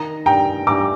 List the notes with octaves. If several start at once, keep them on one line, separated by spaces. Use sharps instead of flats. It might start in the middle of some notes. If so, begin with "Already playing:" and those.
Already playing: D#3 A#5
G2 G5 A#5
G2 A#5 D6